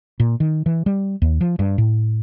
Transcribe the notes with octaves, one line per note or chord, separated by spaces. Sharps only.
A#2
D#3
E3
G3
D#2
F3
G2
A2